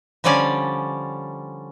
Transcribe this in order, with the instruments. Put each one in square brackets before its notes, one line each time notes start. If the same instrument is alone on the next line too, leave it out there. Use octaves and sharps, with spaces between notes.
[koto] D3 F3 G3 C#4 D5 G#5